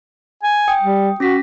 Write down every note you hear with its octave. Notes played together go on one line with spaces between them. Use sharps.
G#5
G5 D#6
G3
C#4 F#4 A#6 B6